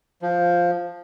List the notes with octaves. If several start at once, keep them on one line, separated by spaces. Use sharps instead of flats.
F3